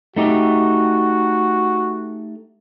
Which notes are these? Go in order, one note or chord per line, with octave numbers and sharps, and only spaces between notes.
A3 D#4 F#4 G4